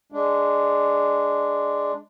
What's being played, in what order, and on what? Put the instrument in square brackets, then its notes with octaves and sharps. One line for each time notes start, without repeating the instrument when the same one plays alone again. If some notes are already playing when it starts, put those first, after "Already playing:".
[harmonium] G#3 D4